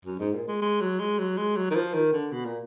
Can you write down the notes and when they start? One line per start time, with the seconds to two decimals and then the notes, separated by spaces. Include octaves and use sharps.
0.05 F#2
0.20 G#2
0.34 A#2
0.48 G#3
0.62 G#3
0.81 F#3
0.99 G#3
1.19 F#3
1.37 G#3
1.56 F#3
1.70 D#3
1.75 F3
1.94 D#3
2.13 D3
2.32 B2
2.46 A#2